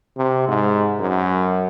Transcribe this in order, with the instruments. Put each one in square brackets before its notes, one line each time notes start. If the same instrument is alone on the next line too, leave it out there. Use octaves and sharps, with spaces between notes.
[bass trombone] C3
G#2
F#2